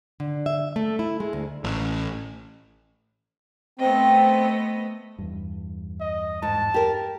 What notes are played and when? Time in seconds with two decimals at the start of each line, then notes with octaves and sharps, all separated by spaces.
0.20 D3
0.46 E5
0.76 A3
0.99 E4
1.20 G#3
1.33 D2
1.64 A1
3.79 A3 B3 C4 D#5
5.19 E2 G2
6.00 D#5
6.42 G#2 A5
6.74 G4 A#4